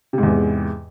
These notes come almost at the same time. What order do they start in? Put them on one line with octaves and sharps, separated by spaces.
C3 G#2 E2 E3